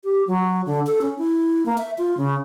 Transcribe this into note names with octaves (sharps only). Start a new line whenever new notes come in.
G4
F#3
D3
A4
C#4
E4
A#3
E5
F4
C#3